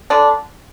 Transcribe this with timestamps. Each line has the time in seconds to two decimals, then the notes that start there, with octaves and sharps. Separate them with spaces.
0.10 D3 D4